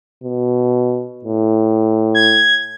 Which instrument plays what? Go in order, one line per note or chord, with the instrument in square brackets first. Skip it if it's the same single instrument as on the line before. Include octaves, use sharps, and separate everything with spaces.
[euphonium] B2
A2
[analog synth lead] G#6